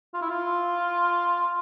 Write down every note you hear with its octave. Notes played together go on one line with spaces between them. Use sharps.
F4
E4
F4